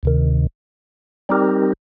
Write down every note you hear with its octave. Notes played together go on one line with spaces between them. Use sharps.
D2 C3 D#3
G3 C4 D#4 G4 A#4